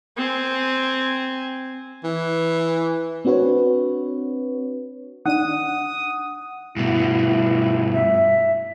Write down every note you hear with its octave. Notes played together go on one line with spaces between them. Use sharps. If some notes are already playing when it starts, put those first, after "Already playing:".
C4 G#5
E3
C4 D4 F#4 B4 C#5
D#3 D4 F#5 D#6 D#7
G2 B2 E4
E5